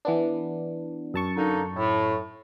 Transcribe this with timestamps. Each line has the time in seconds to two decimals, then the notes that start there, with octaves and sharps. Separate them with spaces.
0.05 E3 B3 D4
1.14 F#2 A5 C#6
1.36 D3 A#3 D#4
1.76 A2